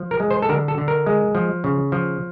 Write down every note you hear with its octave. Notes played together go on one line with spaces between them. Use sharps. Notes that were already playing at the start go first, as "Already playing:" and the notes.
Already playing: F3
A#4
G#3
C5
A4
D3 A#4
A4
D3
A#4
G#3
F3
C#3
F3